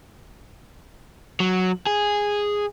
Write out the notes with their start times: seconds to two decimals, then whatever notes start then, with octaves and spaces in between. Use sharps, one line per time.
1.40 F#3
1.86 G#4